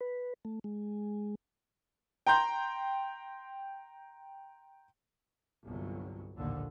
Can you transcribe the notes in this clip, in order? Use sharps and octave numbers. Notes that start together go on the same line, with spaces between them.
B4
A3
G#3
G5 A#5 C6 G6
G1 C2 F#3
A#1 D#2 A2 D3